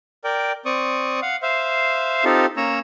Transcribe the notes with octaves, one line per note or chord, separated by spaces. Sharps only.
A#4 D5 G5
C4 D5 C#6 D#6
F5 F#5
C5 E5 F5
C4 D#4 F4 G4 A4
A#3 C#4 C#5 A#5 E6